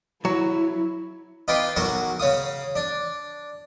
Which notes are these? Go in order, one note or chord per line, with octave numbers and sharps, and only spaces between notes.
F#3 E4
D#4 F4 B4 G5 C6 D6
B1 F#3 F#4 A#4 F#5 C#6
C#3 C#5 F5 D#6
D4